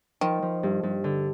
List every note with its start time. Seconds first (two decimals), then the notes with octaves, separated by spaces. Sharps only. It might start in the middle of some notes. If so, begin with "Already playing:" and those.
0.21 D#3 F3
0.42 F3
0.63 G2
0.83 G2
1.04 D3